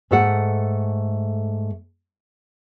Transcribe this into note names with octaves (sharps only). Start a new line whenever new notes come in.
G#2 A3 A4 F#5